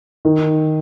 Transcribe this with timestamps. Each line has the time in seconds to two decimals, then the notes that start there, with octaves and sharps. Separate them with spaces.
0.25 D#3